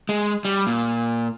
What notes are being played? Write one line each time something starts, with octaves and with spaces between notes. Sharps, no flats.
G#3
G3
A#2